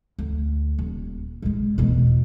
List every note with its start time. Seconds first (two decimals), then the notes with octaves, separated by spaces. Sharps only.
0.19 D2
0.79 D#1
1.42 A#2 G#3
1.78 E2 B2